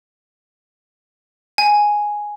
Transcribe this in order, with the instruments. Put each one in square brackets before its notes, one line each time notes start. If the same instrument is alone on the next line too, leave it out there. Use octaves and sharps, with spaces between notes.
[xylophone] G#5